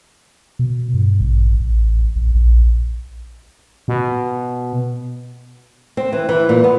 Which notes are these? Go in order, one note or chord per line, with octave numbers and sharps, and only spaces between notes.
B2
G2
A1
A1
A#1
A#1
B2
C4
E3
E3
A#2
B3